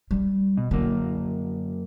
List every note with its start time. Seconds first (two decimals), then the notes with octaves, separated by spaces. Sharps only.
0.11 G3
0.57 B2
0.71 F#2 D3 A#3